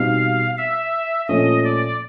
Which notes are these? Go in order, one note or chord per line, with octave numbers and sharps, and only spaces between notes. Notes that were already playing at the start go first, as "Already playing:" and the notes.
Already playing: B2 G3 C4 D#4 F5
E5
A#2 F3 A3 C#4 D#5
D5